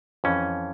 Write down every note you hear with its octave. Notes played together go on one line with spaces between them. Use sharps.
F2 E3 C#4